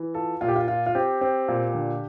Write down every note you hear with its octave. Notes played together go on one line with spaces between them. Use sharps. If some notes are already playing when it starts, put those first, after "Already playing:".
Already playing: E3
F4 A4
A#2 F4
G4
F4
F4
F4
C4 G4
C4
A#2
D3